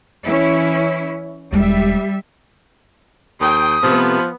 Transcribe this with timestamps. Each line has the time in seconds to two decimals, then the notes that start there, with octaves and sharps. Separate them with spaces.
0.24 E3 C#4 E4
1.53 E1 G3 G#3 E5
3.41 D#2 G5 D#6
3.83 C3 F3 A3 B3 C4 B4